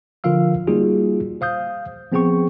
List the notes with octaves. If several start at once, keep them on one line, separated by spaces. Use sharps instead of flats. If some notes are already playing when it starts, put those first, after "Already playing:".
D3 F3 F4 A#4 F5 E6
G3 A#3 D#4 F4 F#4 G#4
C5 F5 D#6 G6
F3 B3 C4 G#4 G5 C#6